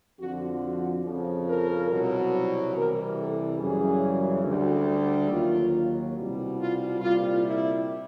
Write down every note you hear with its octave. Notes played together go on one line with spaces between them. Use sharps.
F2 D3 F3 F#4
F#4
F2 C#3 F3
A#4
C2 B2 F#3
C2 C3 E3 G3 A#4
A4
F#2 C#3 E3 G3 G#4
D2 D3 G3
D#2 D#3 F#3 F4
C2 B2 G3
F4
C2 A#2 G3 F4
E4